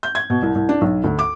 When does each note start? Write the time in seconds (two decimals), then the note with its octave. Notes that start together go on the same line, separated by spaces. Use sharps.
0.03 G6
0.15 G#6
0.30 B2
0.42 C2
0.55 C2
0.69 D4
0.81 B1
1.04 D2
1.19 D6